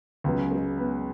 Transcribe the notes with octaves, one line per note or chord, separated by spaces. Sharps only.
C#2 C#3 F#3 B3 B4
G#3 G#4
B3 B4